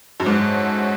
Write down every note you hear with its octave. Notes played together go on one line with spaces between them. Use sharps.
F#2
G#2 C#4 F#4 A4 C#5 E5